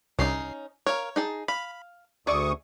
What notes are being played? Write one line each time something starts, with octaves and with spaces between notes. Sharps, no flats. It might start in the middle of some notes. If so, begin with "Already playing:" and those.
C2 C#4 D#4 C7
A#4 C#5 F5
D#4 G#4 A5
F5 B5
D2 G#4 D5 E5 C#6 D#6